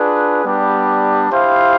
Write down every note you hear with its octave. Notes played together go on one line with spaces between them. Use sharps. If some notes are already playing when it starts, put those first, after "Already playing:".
Already playing: D4 F4 G#4 B4
G3 B3 D4 G4
E4 G4 C5 F5